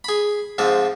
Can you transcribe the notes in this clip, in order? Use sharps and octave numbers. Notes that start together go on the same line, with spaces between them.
G#4 B5
G#2 F3 C4